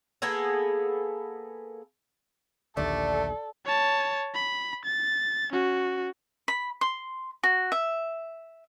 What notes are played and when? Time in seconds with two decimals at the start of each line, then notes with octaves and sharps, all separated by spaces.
0.22 A#3 B3 G#4 A4
2.77 A#1 D#2 D3 A3 A4 D5
3.65 C#5 A5
4.34 B5
4.85 A6
5.53 C#4 F#4
6.48 B5
6.81 C6
7.43 F#4
7.72 E5